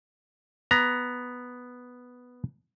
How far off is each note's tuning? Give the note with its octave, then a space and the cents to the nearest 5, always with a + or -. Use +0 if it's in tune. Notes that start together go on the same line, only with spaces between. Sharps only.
B3 +0 A#5 +15